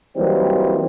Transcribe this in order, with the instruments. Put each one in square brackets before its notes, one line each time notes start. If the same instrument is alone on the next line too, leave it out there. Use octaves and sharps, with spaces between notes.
[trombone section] E3 F#3 G3 A#3 C4 D#4